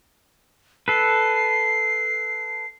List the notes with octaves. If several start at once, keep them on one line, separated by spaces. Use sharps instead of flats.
A4 B4 C7